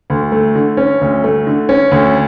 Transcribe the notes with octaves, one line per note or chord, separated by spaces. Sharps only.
D2
A3
D3
C#4
D2
A3
D3
C#4
D2